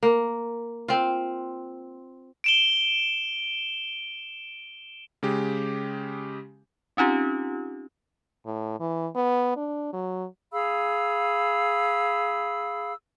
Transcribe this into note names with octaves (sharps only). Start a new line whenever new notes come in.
A#3
C4 F4
D7 E7 G7
C#3 G#3 G4
C4 C#4 D#4 F4 G4
A2
E3
B3
D4
F#3
G#4 F5 B5 E6